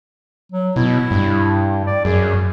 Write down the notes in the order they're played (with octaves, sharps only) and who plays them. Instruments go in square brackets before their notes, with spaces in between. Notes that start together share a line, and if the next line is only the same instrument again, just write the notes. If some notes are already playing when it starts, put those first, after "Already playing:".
[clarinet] F#3
[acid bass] B2 [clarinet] E4
[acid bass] G2
[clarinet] D5
[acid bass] F#2 [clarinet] G#4